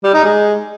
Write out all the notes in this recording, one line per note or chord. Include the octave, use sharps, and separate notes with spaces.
G3
D#4
G#3